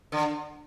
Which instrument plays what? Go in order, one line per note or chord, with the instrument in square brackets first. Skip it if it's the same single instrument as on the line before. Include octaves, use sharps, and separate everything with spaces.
[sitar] D3